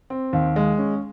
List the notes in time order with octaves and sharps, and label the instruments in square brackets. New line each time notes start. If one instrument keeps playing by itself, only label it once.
[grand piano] C4
D#2
G#3
C#4